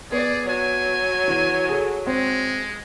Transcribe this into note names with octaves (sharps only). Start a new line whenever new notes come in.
B3 G#4 D5
F#3 G#5
E2 D#7
G#4 A4
G#3 C4